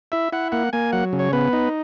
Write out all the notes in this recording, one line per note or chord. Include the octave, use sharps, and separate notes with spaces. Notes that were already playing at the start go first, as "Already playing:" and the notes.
E4 E5
E4 F#5
A#3 F#5
A#3 G#5
F#3 F#5
C#3
C#5
B3 B4
D#4